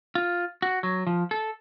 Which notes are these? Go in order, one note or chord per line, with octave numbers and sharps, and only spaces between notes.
F4
F#4
F#3
F3
A4